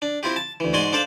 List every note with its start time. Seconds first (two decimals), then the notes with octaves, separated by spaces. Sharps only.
0.02 D4
0.23 C4 E4 F4 G4
0.36 A5
0.60 D2 E3
0.73 G#2 F#4 D5 G#5 C6
0.93 D4 A4 C5 D5 F5